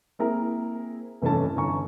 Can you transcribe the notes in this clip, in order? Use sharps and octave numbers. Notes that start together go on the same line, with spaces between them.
A#3 C4 E4 G#4 A#4 A#5
F1 G2 E3 A3 C#4 A5
G1 C#4 G#5 A#5 C#6